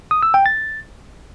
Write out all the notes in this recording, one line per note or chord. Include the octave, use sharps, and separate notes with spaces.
D#6
E6
G5
A6